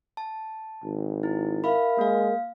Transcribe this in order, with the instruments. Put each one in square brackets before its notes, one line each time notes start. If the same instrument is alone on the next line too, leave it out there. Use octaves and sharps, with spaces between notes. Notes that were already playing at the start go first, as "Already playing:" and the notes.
[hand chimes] A5
[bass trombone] G#1
[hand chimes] E4
[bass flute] A#4 [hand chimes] E5 F5 B5
[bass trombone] G#3 [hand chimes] A#3 F5